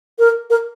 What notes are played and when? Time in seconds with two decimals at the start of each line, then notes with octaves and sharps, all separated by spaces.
0.19 A#4
0.50 A#4